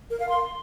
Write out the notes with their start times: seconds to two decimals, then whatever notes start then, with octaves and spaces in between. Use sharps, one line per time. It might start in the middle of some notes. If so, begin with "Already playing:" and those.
0.10 A#4
0.20 F5
0.29 C6